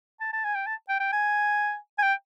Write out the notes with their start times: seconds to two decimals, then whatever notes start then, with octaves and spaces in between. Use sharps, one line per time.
0.20 A5
0.33 A5
0.44 G#5
0.55 G5
0.67 A5
0.89 G5
1.00 G5
1.12 G#5
1.98 G#5
2.03 G5